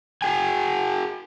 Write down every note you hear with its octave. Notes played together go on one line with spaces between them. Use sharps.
F#4 G#4 G5 G#5